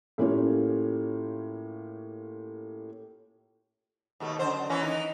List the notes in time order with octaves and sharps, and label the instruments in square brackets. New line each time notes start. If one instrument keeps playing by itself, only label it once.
[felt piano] A2 A#3 C#4 F4 G4 C#5
[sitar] D#2 B2 A3
F#2 D3 C5
E3 A#3 C#4
E3 D#4